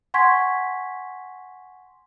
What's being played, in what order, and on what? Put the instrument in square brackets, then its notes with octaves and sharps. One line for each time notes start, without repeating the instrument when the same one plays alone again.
[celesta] F#5 G#5 C6 C#6 G#6 B6